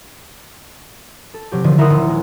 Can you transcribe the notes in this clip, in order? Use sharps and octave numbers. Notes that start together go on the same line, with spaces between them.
A4
C3 F#3 G4
D3 D#3 F3 F#3
E4 A#4 E5 F#5 C6 D#6
D#1
G#3